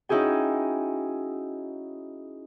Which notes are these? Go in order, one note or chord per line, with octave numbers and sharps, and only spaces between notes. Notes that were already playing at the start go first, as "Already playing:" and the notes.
C#4 D#4 E4 F#4 G#4 G5